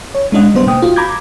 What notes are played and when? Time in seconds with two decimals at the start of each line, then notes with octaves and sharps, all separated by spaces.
0.15 C#5
0.32 G#3 C#4 D4 D#5 F#5
0.55 G3 B3 C5
0.67 B2 A#3 G5 D#6
0.82 F4 F#4
0.96 A#5 B5 D6 G6 G#6